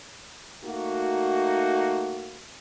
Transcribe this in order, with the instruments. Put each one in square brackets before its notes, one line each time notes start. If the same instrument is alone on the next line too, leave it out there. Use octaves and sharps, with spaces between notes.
[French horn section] A3 A#3 D#4 F#4